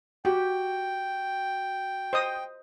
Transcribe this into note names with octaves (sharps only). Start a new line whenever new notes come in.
F#4 G4 G5
C5 D#5 D#6